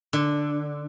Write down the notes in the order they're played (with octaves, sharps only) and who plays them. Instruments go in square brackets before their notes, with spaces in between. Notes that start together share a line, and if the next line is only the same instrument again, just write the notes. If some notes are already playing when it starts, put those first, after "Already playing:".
[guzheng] D3